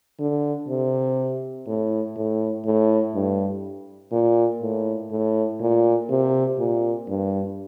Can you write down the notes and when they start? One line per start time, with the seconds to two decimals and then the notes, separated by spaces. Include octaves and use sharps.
0.19 D3
0.68 C3
1.67 A2
2.16 A2
2.65 A2
3.15 G2
4.12 A#2
4.62 A2
5.11 A2
5.60 A#2
6.10 C3
6.59 A#2
7.08 G2